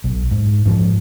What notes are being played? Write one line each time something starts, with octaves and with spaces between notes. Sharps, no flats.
B1
G#2
G#2 F3